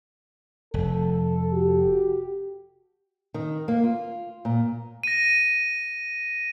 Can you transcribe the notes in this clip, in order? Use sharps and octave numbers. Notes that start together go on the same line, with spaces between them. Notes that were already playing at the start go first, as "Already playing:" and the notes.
F1 A4
F#4 G4
D#3
A#3
F4
A#2
A#6 D#7